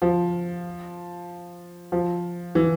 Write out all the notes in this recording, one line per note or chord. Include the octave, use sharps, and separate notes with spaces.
F3
F3
E3